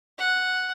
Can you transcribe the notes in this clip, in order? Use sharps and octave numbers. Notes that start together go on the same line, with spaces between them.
F#5